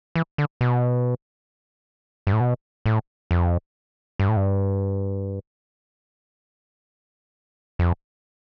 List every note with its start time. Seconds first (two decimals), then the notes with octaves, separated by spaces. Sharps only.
0.15 E3
0.38 D3
0.61 B2
2.27 G2
2.33 A2
2.41 B2
2.86 A2
3.31 F2
4.19 G2
4.29 A2
4.37 G2
7.79 F2